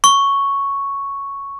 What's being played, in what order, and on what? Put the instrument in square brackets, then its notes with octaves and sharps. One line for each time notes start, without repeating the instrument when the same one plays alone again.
[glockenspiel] C#6